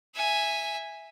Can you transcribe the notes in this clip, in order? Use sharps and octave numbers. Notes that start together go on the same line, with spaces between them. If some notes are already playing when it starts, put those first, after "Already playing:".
E5 G#5